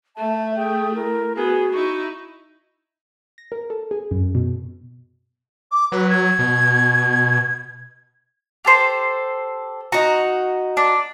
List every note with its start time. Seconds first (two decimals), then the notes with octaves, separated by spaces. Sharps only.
0.17 A3 E5 A5
0.56 G#4 G5
0.95 E4 A#4
1.36 B3 F#4 G#4
1.73 D#4 E4 C#6
3.38 A#6
3.52 A#4
3.70 A4
3.91 G#4
4.11 F#2
4.35 B2
5.71 D6
5.92 F#3 B4
6.10 G#6
6.39 B2
8.65 G4 A4 C5
9.92 D#4 F#4 A#5 C#6
10.77 D4